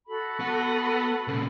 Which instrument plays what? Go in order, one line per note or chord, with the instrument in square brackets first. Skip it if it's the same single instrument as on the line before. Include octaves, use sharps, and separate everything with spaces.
[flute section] F#4 A4 B5
[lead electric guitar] B3 F#5
A#2 C#3